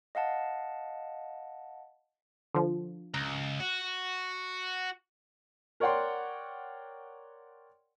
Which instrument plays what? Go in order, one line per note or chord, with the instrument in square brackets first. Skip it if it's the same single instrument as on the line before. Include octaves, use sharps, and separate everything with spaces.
[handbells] D#5 F5 F#5 A5
[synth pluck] D3 F3
[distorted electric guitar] C#2 [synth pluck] A#5
[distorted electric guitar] F#4
[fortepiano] A#4 C#5 D5 F#5 G5 C6